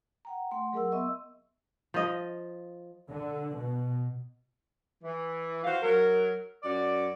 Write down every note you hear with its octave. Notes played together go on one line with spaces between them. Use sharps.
F#5 G5 A#5
A3 F#5 C6
F#3 G#4 A#4 D#5 F#5 E6
B3 D#5 E5 C6 C#6 E6
F3 D#5
D3
B2
E3
F#4 C5 F5
F#3 A#4
F#2 F#4 D5